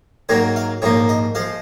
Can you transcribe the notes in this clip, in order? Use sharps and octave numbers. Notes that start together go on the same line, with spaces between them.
G#2 D#3 F#3 A#3 C#5
F5
A#1 G#2 F3 A#3 C#5
D#5
F3 G#3 F5